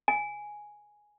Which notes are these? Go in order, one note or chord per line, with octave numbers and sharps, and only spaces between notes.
G#5